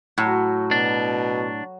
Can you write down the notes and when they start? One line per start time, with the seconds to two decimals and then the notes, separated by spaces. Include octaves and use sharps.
0.18 A2 F#3 F#4
0.71 B2 D4